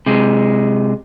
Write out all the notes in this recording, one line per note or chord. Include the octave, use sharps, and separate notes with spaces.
C3 G#3